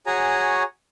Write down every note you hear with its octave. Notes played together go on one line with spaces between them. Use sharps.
F#4 G#4 C#5 G#5 A#5